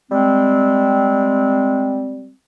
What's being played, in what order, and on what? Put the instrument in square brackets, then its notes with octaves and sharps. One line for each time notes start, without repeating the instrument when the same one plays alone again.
[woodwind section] G3 G#3 C4